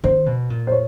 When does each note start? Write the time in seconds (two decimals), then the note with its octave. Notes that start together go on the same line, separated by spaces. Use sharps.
0.04 D#3 C5
0.26 B2
0.50 A#2
0.67 C5
0.72 C#5